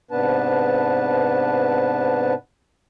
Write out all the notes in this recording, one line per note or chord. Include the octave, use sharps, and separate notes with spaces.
G#2 C3 B3 D4 B4 A5